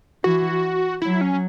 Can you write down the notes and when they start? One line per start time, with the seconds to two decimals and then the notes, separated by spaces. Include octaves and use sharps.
0.24 E3 F#4
1.02 F#3 E4
1.21 C#4